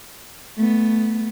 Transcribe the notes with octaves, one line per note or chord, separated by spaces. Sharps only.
A3 B3